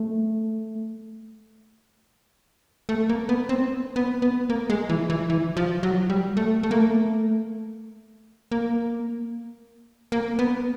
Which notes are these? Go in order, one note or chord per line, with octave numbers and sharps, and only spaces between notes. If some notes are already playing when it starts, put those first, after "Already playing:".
Already playing: A3
A3
A#3
B3
C4
B3
B3
A#3
G#3
E3
E3
E3
F3
F#3
G3
A3
A3
A#3
A3
A#3
A#3
B3